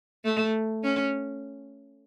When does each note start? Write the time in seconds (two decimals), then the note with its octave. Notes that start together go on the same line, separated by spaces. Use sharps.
0.25 A3
0.83 C#4